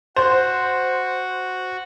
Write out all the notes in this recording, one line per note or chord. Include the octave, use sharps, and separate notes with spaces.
F#4 C5